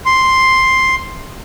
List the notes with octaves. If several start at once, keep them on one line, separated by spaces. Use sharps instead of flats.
C6